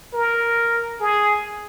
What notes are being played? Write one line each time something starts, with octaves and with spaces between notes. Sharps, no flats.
A#4
G#4